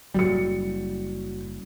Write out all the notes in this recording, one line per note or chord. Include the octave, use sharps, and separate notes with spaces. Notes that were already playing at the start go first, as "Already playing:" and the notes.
F#1 C#2 F#3 G3 C#7